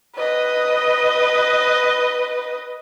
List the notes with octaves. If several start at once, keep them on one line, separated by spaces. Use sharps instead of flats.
B4 D#5